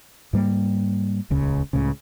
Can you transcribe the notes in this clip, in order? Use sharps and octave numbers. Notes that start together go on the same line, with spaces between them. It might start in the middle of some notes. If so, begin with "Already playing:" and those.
G#2 G3 A#3
D#1 C#2 C#3
C#2 A2 C#3